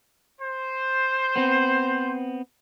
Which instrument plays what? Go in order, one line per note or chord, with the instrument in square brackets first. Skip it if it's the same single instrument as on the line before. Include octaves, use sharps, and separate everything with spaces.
[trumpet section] C5
[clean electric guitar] B3 C4